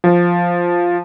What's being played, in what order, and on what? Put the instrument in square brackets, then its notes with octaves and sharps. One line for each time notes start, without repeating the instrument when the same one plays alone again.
[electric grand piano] F3